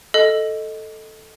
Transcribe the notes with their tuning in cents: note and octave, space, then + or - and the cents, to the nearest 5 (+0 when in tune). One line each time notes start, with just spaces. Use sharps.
A4 +0 D#5 +0